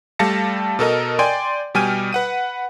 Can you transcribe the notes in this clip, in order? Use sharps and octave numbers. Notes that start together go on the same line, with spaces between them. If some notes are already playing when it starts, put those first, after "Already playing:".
G3 A3 F5 A5 A#6 C#7
B2 A4 A#4 D#5
D5 G5 G#5 C6
B2 G3 G5 G#5 F6 D#7
B4 F#5 D#7